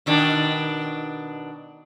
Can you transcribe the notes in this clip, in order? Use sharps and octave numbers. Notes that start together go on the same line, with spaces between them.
B2 D#3 D4